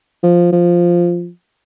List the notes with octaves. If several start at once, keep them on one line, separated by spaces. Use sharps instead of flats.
F3
F3